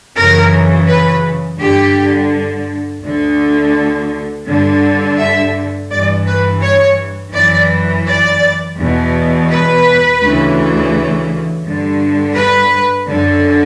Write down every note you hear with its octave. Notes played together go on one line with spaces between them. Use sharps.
F#2 C#3 E3 A#4
B4
G2 D3 G4
D2 D3
G2 D3
E5
G2 E3 D5
B4
C#5
F#2 E3 D5
D5
E2 B2
B4
D2 C#3 E3
G2 D3
B4
F#2 D3